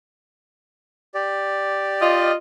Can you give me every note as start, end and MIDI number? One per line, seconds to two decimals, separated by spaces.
1.14 2.31 67
1.14 2.31 74
2.01 2.34 65
2.01 2.34 75